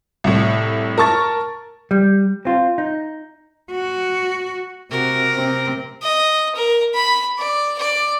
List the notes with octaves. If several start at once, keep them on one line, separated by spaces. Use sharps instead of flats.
C2 A2
A#4 A5 C#6 A6
G3
C4 F4
D#4
F#4
C3 F#4 A#4
C3 C4
D#5
A#4
B5
D5
D5